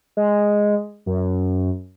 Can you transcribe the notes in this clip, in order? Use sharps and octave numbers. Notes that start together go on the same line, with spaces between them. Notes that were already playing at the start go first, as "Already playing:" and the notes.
G#3
F#2